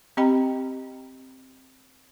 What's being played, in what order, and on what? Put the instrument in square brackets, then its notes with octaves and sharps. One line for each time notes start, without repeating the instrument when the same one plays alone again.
[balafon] C4 G4 D#5 G5 A#5 B5